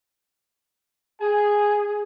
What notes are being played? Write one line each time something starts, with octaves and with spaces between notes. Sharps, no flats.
G#4 G#5